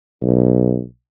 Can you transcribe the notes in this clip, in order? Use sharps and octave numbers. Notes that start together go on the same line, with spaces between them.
B1